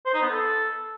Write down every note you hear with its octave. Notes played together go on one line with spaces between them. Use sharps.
C5
D#4
B3
A4